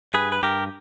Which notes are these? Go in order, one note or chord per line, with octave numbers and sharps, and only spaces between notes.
G2 G#4 B4
B4
G2 G4 A#4